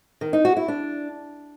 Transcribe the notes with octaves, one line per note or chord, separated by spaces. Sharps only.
D#3
D#4
F#4
E4
D4